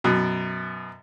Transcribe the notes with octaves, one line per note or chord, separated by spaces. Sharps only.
F#2 B2